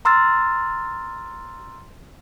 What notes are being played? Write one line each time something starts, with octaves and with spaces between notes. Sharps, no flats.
A#5 C6 E6 F6 A6